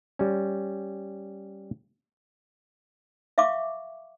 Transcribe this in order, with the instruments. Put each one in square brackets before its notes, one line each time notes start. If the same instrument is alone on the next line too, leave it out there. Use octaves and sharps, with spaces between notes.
[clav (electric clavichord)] G3 C#4
[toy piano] E5 F5 C#6 D6